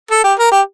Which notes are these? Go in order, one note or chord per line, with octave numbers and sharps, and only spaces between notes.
A4
G4
A#4
G4